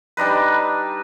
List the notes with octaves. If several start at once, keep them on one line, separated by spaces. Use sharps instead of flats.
G3 D4 D#4 B4